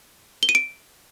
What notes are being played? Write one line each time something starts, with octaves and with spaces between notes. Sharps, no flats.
G7
D#7
D7